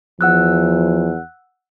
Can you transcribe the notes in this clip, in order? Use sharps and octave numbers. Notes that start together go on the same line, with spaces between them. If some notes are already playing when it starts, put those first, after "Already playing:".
E2 F3 F#5 E6 F#6